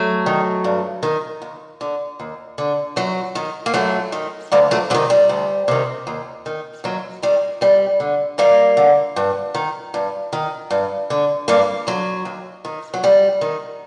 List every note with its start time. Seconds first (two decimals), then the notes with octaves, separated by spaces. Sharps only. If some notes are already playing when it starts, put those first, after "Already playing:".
Already playing: F#3 A3
0.26 D#3
0.64 G2
1.03 D#3
1.42 D#2
1.81 D3
2.20 D#2
2.58 D3
2.96 F#2 F#3
3.35 D#3
3.66 A#3
3.74 F#2 F#3 A3
4.12 D#3
4.52 D2 G3 A#3
4.71 F#3 A3
4.90 C3 F#3
4.94 D#3
5.10 G3
5.29 D2
5.68 C3 D#3
6.07 D#2
6.46 D#3
6.84 D#2 F#3
7.22 D#3 G3
7.61 D#2 G3
8.00 D3
8.38 D#2 G3 A#3
8.77 D3
9.16 G2
9.54 D#3
9.94 G2
10.33 D#3
10.70 G2
11.10 D3
11.48 G2 G3 A#3
11.87 D3 F#3
12.25 D#2
12.65 D#3
12.94 F#3
13.03 D#2 G3
13.41 D#3